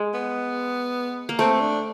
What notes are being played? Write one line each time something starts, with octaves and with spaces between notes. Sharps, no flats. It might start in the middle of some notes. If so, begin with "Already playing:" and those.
Already playing: G#3
B3
A#3
A3 C4
D4